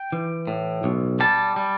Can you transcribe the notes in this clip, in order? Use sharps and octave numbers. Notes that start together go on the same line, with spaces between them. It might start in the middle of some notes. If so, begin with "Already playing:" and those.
Already playing: G5
E3
A2
B1
G3 A5
G3